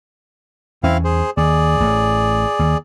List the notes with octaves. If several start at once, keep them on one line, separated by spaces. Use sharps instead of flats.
E2 C4 C#4 E4 F5
G#4 C5
D#2 G#4 D5
A1 A2
D#2